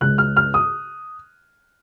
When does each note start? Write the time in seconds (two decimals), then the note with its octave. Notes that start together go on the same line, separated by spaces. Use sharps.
0.01 C#2 C#3 G#3 C#4 F#6
0.18 F6
0.37 F6
0.54 D#6